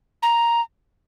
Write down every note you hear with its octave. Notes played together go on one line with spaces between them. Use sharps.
A#5